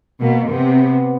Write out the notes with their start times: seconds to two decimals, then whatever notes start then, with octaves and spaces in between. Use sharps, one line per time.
0.21 B2 A#3
0.50 C3 B3